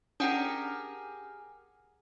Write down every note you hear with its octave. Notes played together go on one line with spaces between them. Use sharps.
C#4 D4 G4 G#4 A#4 F#5 G#5 D#6